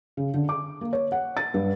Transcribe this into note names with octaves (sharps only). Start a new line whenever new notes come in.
C#3
D3
D6
A#3
C#5
F#5
A6
G2